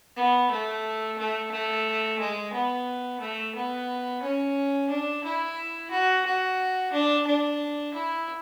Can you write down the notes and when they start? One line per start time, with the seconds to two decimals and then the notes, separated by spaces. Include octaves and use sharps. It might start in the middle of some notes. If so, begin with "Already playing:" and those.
0.16 B3
0.51 A3
1.18 A3
1.52 A3
2.20 G#3
2.53 B3
3.21 A3
3.55 B3
4.22 C#4
4.90 D4
5.24 E4
5.91 F#4
6.26 F#4
6.92 D4
7.27 D4
7.94 E4